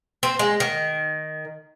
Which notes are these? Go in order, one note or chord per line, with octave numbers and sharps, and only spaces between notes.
C4
G#3
D#3